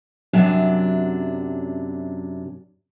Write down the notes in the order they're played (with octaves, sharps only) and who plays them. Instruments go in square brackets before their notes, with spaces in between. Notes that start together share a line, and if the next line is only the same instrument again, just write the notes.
[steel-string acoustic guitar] F#2 C3 F#3 D4